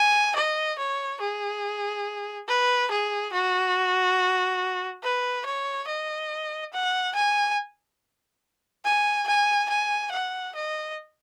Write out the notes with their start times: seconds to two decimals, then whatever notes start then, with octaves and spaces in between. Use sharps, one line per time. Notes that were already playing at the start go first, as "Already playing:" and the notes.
Already playing: G#5
0.36 D#5
0.78 C#5
1.21 G#4
2.48 B4
2.91 G#4
3.33 F#4
5.03 B4
5.46 C#5
5.88 D#5
6.73 F#5
7.15 G#5
8.85 G#5
9.28 G#5
9.70 G#5
10.12 F#5
10.55 D#5